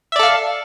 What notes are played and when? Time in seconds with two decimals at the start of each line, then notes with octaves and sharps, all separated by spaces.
0.12 E5
0.16 D5
0.19 A4
0.23 F5